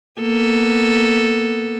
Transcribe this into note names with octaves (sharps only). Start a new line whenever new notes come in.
A#3 B3 A4